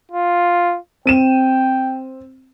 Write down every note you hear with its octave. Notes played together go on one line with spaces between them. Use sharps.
F4
C4 G5 D#7 E7